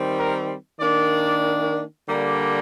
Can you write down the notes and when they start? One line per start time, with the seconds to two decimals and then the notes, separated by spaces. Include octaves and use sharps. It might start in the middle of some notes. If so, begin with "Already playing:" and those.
Already playing: D#3 G3 C4
0.15 A#4
0.79 D#3 A#3 D4 D5
2.07 D3 G3 A#3